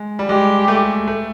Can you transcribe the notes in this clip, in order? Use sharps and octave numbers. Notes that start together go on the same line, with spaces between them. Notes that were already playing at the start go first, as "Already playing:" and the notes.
Already playing: G#3
G3
G#3 G4
A3
A3